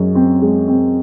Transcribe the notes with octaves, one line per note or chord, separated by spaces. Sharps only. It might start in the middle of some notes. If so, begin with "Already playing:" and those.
Already playing: F#2 G#3
C4
G#3
C4